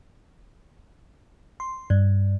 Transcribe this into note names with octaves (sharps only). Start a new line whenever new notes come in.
C6
G2